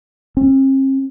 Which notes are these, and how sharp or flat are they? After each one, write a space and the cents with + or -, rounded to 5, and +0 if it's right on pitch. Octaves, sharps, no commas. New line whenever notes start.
C4 +45